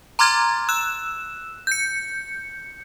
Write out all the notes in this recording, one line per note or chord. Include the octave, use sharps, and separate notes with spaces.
A#5 C6 D6 F6 G#6 A6
E6 F#6 E7
G6 C#7